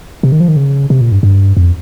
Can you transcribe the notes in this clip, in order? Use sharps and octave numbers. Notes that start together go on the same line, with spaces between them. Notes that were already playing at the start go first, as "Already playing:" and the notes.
C3
D#3
F3
D#3
C#3
C3
A#2
G2
G2
F2